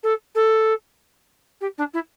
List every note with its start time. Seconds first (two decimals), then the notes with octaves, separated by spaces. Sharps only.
0.03 A4
0.35 A4
1.61 G4
1.78 D4
1.93 E4